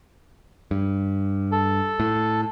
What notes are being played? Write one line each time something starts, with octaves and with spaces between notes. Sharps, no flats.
G2
A4
A2